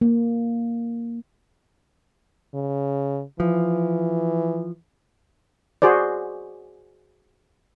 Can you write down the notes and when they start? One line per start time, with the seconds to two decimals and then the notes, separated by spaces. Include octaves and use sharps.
0.01 A#3
2.54 C#3
3.40 E3 F3
5.82 F#4 G#4 C5 D5